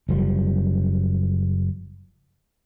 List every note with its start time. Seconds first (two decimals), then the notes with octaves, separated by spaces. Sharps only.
0.09 F#1 F3 G3